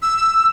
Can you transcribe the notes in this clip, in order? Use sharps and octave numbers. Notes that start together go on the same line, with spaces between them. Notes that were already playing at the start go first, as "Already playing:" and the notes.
E6